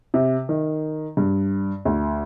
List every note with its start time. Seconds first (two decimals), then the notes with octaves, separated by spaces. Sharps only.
0.14 C3
0.49 D#3
1.17 G2
1.85 D2